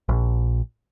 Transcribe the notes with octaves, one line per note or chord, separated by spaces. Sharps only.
A#1